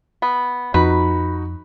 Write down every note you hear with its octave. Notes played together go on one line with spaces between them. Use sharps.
B3
F2 D#4 F#4 B4 B5